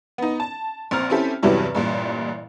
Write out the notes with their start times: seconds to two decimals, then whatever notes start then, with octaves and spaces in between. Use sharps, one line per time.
0.18 B3 D#4
0.40 A5
0.91 A#1 C4 A#5 F6
1.10 C4 C#4 E4 G4 A4
1.43 E2 G2 C3 E3 F#3 G3
1.75 A1 G2 A#2